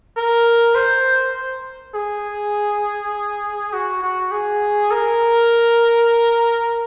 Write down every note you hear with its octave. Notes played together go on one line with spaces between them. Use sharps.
A#4
C5
G#4
F#4
F#4
G#4
A#4